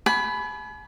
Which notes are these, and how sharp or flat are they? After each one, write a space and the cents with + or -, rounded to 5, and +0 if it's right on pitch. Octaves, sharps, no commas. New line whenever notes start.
G#5 +40 B5 +5